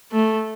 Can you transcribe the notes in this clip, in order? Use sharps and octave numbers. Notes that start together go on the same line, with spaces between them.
A3